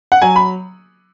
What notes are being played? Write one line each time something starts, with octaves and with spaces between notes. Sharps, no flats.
F#5
F#3 G#5
B5